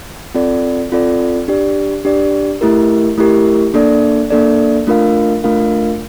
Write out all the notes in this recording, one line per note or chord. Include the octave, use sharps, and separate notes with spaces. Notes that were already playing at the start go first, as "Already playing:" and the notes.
C4 F4 A4 D5
C4 F4 A4 D5
D4 G4 D5
D4 G4 D5
A3 E4 G4 A#4
A3 E4 G4 A#4
A#3 D4 A4 D5
A#3 D4 A4 D5
A3 D4 F4 A#4 F5
A3 D4 F4 A#4 F5